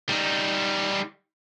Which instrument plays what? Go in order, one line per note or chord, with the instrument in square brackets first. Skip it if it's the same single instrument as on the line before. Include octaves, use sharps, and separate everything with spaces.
[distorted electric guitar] G3 D#4